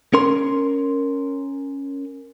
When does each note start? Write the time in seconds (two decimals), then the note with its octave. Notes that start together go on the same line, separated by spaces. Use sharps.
0.14 C#4 A#4 C6